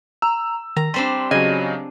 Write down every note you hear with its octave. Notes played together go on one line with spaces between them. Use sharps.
A#5 E6
D#3 A#5
G3 C4 D4 C6
C#3 F#3 D#5 G#5